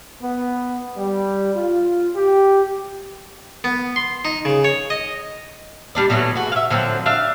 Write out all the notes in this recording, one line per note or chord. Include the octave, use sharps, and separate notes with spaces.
B3
G3
F4
G4
B3
C6
D#4
C#3
C#5
D#5
G3 D4 D5
B2 E3 F#3 A3
F#4 G#4
E5 F5
D3 F3 F#3 C4
D4 E5 F5